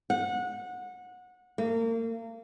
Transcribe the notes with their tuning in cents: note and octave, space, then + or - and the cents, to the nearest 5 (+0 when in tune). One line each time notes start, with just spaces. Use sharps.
F#5 -25
A#3 -35